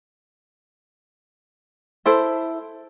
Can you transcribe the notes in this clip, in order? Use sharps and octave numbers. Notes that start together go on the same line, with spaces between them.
E4 A4 C5 E5